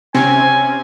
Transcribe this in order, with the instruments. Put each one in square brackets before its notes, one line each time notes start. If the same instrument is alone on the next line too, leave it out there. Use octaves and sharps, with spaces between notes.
[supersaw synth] C3 C4 C#4 [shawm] G#5